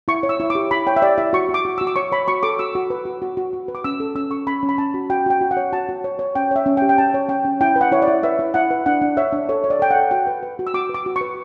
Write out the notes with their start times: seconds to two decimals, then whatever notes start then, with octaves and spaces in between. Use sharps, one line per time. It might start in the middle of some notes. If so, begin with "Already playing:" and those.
0.08 E4 C#6
0.23 C#5
0.29 E6
0.40 E4
0.50 D6
0.55 G4
0.71 E4 B5
0.87 C#5 G5
0.96 E5
1.02 G4 D5
1.18 E4 E5
1.33 F#4 C#6
1.49 F#4
1.54 D6
1.65 F#4
1.78 F#4 E6
1.87 D6
1.96 C#5 C#6
2.12 C#5 B5
2.28 F#4 C#6
2.43 A4 D6
2.59 F#4 E6
2.75 F#4
2.90 B4
3.05 F#4
3.22 F#4
3.37 F#4
3.53 F#4
3.68 B4
3.75 D6
3.84 C#4 E6
4.00 A4
4.15 C#4 E6
4.31 A4 C#6
4.47 C#4 B5
4.63 C#4
4.69 B5
4.78 C#4 A5
4.94 F#4
5.10 F#4 G5
5.26 F#4 G5
5.41 F#4
5.51 F#5
5.57 C#5
5.72 F#4 A5
5.89 F#4
6.04 C#5
6.19 C#5
6.35 C#4 G5
6.51 C#5 E5
6.66 C#4
6.77 G5
6.82 G4
6.89 G5
6.98 C#4 A5
7.14 C#5
7.29 C#4 G5
7.45 C#4
7.61 E4 G5
7.76 B4
7.81 F#5
7.92 E4 C#5
8.02 D5
8.08 E4
8.23 B4 E5
8.39 E4
8.54 E4 F#5
8.71 B4
8.86 D4 F#5
9.01 D4
9.17 C#5 E5
9.32 D4
9.49 A4 C#5
9.64 C#5
9.70 D5
9.80 A4 G5
9.91 F#5
9.96 A4
10.11 F#4 G5
10.27 B4
10.43 B4
10.59 F#4
10.67 E6
10.74 F#4 D6
10.89 B4
10.94 D6
11.06 F#4
11.16 C#6
11.21 B4